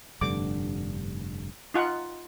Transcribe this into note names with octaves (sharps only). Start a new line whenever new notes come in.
F1 G2 D3 D6
D#4 F4 F#5